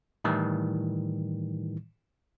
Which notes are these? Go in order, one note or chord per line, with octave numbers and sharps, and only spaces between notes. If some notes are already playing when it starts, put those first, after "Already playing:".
A2 D#3 E3 G3